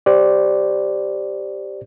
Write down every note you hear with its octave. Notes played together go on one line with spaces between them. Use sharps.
G4 C5 D5